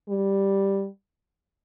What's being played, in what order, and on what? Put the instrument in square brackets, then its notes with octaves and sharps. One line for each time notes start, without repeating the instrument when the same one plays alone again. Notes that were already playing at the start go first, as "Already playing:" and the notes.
[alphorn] G3